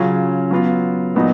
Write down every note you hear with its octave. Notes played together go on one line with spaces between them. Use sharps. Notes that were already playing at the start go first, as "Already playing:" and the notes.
Already playing: C#3 F#3 C#4 F4
F#3 B3 F4
A#2 F#3 B3 D#4